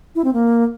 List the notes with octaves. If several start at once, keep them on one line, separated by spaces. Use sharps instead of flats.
E4
C4
A#3